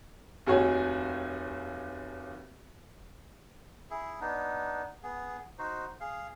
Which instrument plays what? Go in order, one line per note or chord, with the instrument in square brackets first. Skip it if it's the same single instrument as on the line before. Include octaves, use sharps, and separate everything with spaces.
[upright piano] F1 D#2 F#4 G#4 C#5 G5
[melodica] E4 G#4
B3 D4 D#4
B3 G#4
D#4 F#4 C5
G#4 F5